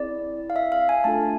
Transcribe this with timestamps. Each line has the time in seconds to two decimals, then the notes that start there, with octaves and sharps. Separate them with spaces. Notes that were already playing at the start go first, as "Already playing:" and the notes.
Already playing: C4 E4 G#4 D5
0.50 F5
0.56 E5
0.72 F5
0.89 G#5
1.04 A3 D4 F4 A4 A5